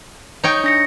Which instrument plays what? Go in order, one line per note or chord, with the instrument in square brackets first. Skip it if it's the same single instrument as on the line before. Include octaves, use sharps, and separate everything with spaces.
[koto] D#4 C#5 G5
[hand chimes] D4 A#6 C#7